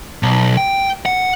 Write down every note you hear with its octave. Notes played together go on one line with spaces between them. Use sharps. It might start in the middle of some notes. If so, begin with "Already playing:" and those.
B1
G5
F#5